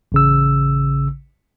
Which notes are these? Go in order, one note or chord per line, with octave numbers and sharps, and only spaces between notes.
A1 C#3 E6